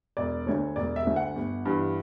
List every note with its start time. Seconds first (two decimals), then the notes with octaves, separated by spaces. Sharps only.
0.17 E1 D5
0.46 D2 D3 C#5
0.76 E1 D5
0.96 E5
1.06 D2 D3
1.16 F#5
1.36 G1
1.65 G2 E3